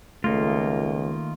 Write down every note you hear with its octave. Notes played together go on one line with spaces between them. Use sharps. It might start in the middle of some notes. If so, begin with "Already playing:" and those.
C#2 D#3 A3 A#3 F4